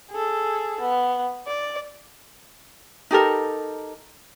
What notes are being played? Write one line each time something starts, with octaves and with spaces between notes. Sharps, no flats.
G#4 A4
B3
D5
D#4 G4 A4 A#4